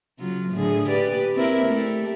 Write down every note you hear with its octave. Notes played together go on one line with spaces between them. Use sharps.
C#3 F#3 F4
A2 D3 G#4
G4 B4 D5
C4 E4 A#4
A3 G4